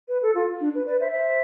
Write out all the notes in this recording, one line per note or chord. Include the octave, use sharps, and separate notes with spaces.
B4
A4
F4
D4
B4
B4 D5
C5 E5
C5 E5